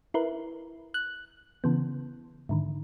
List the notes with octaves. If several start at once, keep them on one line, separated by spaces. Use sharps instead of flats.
E4 A#4 B4
F#6
C#3 E3 B3
G#2 D3 D#3